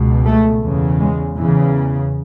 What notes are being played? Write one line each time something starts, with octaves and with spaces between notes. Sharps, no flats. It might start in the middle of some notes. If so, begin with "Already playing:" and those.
Already playing: C#2 B2
A3
E2 C#3
G#3
E2 C#3 E3